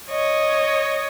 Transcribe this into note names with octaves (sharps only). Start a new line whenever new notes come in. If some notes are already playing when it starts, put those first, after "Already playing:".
C#5 D#5